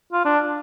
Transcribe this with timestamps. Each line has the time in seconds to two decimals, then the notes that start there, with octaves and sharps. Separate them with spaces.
0.13 F4
0.25 D4